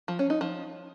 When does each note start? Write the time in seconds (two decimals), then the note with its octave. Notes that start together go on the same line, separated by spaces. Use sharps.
0.08 F3
0.19 C#4
0.30 D#4
0.41 F3